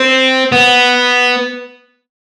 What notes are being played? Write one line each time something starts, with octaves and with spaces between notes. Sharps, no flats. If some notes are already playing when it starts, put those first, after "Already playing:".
Already playing: C4
B3